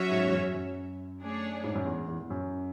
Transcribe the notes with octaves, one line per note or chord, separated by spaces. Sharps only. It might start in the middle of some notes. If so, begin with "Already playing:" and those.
Already playing: F#3 C#4 F#4 C#5 E5
G#2
E2
F#2
F#2
A3 D4 G#4 C#5
G#2
F#2
E2
E2
E2
F#2